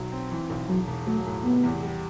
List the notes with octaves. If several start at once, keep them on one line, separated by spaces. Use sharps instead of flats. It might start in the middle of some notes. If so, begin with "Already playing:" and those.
Already playing: B1 F#3
C4
E3
B1
E1 F#3
E1
F#3 A3
A2
C3 B3
E2
G3